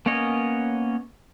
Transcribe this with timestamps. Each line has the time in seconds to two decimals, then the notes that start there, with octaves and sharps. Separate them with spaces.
0.06 A#3 B3 C#4 C#5 D#5